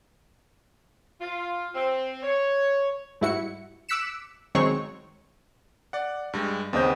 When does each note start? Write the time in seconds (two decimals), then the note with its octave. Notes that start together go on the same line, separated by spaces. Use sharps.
1.21 F4
1.75 C4
2.23 C#5
3.21 G#2 G3 E4 F#4 C#7
3.89 D6 E6 F#6 B6 C#7 E7
4.55 D#3 F#3 G#3 C4 C#5 C#6
5.93 D5 F#5
6.33 G2 G3 G#3
6.73 D#2 C#3 B3 C4 D#5 G6